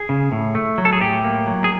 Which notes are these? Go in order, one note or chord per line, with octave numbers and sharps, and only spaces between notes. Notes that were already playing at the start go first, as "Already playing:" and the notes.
Already playing: G#4
C#3
A2
A3
F#3
A4
G#4
A2 G4
A#3
F#3
G#4